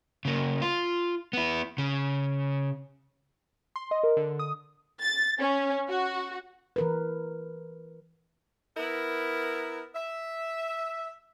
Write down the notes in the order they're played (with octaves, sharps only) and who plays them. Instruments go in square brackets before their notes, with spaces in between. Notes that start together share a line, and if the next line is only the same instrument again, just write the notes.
[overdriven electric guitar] C#3 A#3
F4
B3 E4
C#3
[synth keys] C6
D#5
A#4
D3
D#6
[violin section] A6
C#4
F#4
[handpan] E3 A#4 B4
[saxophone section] B3 E4 A#4
E5